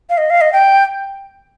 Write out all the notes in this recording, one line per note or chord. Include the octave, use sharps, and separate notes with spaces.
F5
D#5
F5
D#5
G5